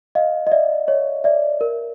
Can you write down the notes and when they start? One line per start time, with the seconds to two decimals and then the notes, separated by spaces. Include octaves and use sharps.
0.15 D#5 F5
0.47 D#5
0.52 D5 E5
0.88 C#5 D#5
1.24 D5 E5
1.61 A#4